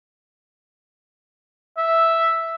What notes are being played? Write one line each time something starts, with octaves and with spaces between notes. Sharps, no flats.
E5